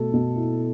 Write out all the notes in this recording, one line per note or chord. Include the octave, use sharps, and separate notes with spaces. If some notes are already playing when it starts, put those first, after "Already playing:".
Already playing: B2 A3 A4
B2
E4